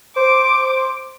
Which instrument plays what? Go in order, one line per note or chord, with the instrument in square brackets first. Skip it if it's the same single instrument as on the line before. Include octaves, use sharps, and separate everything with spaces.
[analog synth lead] C5 [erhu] D6